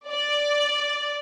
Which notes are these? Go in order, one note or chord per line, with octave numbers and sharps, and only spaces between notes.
D5